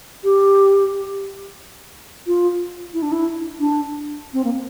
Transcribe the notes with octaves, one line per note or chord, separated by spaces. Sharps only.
G4
F4
E4
D4
E4
D4
C4
A#3